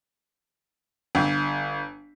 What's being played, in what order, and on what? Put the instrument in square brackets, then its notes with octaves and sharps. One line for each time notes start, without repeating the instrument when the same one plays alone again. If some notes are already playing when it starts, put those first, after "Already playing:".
[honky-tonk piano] G1